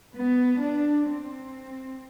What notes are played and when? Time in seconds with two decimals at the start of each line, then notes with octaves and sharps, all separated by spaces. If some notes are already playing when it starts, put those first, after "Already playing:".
0.15 B3
0.62 D4
1.08 C4